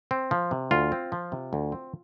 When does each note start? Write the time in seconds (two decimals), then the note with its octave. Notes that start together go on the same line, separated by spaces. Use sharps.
0.11 C4
0.31 F3
0.51 C3
0.71 D2 F4
0.92 C4
1.12 F3
1.32 C3
1.53 D2
1.72 C4